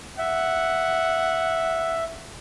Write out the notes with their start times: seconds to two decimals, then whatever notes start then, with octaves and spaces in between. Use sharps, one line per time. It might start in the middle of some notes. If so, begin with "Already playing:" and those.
0.19 E5 F#5